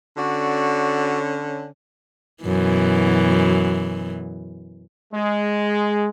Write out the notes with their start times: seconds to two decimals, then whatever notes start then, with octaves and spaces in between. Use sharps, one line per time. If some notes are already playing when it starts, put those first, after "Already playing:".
0.17 D3 C#4 F#4 D5
2.44 F#2 B2 E3
5.13 G#3